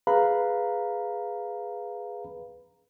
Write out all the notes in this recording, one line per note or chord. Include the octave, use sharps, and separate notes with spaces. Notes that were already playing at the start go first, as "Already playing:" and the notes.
G#4 B4 F5 A#5 B5